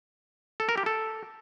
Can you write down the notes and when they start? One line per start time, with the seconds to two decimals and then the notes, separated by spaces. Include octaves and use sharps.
0.60 A4
0.69 A#4
0.77 G4
0.86 A4